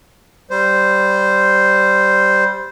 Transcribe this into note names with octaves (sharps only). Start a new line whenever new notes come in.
G3 C5